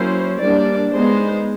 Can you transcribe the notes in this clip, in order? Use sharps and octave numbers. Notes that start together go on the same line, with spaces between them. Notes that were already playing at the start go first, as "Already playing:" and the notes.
Already playing: F#3 A#3 C#4 E4 C5
G3 A#3 D4 D5
G#3 B3 D#4 C5